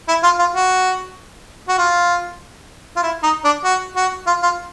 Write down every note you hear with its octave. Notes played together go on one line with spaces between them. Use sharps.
E4
F4
F4
F#4
F#4
F4
F4
E4
D#4
D4
F#4
F#4
F4
F4